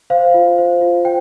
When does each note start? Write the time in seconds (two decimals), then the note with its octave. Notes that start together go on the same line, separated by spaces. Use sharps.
0.10 C5 F5
0.34 F4
0.58 C5
0.81 F4
1.05 C5 G5